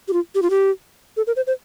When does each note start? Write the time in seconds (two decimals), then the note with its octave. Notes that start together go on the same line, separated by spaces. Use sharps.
0.08 G4
0.13 F4
0.35 G4
0.42 F4
0.50 G4
1.17 A4
1.27 A#4
1.36 C5
1.47 C5